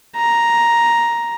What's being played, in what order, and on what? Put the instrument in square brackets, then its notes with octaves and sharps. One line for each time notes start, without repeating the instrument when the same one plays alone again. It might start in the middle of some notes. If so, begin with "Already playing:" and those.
[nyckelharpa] A#5